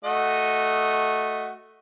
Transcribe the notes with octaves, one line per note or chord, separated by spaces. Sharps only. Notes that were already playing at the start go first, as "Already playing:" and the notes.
A3 F#4 D#5